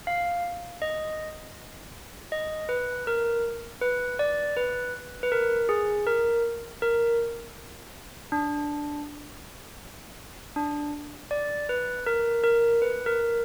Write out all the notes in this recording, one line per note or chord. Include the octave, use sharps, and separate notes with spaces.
F5
D#5
D#5
B4
A#4
B4
D5
B4
B4
A#4
G#4
A#4
A#4
D4
D4
D5
B4
A#4
A#4
B4
A#4